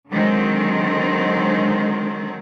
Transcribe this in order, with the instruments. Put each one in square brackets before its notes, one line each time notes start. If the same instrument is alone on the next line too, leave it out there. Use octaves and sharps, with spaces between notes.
[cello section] D3 D#3 F#3 G#3 C4